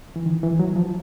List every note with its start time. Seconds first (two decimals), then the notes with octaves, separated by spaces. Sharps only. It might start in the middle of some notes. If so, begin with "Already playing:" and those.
0.16 E3
0.26 D#3
0.43 E3
0.59 F#3
0.76 F3